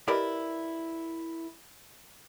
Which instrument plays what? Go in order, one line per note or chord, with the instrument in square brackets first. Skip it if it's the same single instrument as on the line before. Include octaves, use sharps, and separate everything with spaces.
[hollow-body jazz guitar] E4 G4 A#4 B4 D5 D#5